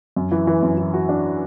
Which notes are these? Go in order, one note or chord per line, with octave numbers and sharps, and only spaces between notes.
F#2
E3
E3
F#2
E3
F#4
D4